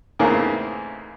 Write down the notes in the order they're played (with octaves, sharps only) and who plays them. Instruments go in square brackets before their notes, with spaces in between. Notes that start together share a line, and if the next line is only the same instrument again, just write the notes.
[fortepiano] E2 G#2 C#3 A3 A#3 C4